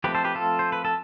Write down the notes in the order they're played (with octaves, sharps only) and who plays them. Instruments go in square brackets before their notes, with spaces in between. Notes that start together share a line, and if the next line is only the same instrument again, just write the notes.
[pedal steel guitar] F3 A3 C4 G4 B4
A4 C5
G4 B4
F4 A4
C5
B4
A4